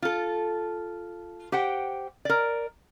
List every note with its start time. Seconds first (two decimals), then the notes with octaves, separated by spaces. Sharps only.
0.02 F4 A4
1.52 G4 C5 F#5 G5
2.25 A#4 D5